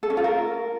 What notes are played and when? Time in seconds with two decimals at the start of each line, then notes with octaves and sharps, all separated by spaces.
0.03 A4
0.10 C#4
0.17 F4
0.24 A#4